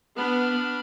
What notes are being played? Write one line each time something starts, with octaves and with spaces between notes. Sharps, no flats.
B3 D4 B5 F6